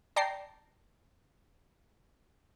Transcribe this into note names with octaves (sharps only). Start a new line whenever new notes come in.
D5 G5 A5 A#5 C7